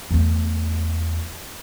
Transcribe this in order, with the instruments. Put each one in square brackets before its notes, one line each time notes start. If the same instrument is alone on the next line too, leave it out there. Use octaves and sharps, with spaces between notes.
[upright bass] E2 A3